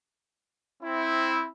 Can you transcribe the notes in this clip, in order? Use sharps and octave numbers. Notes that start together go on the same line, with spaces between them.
C4 E4